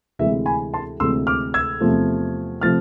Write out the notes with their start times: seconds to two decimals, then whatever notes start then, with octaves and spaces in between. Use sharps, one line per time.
0.19 D2 C3 E3 G#3 E5
0.46 G#5 B5
0.74 A5 C6
1.00 D2 C3 E3 G#3 C6 E6
1.27 D6 F6
1.54 E6 G#6
1.80 E2 C3 F3 A3
2.61 C3 F3 A3 F6 A6